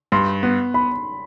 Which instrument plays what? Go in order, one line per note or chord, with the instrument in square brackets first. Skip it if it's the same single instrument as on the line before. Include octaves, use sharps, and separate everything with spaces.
[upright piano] G2 [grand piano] C6
[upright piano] B3
[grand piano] B5